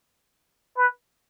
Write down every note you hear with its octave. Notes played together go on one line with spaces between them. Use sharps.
B4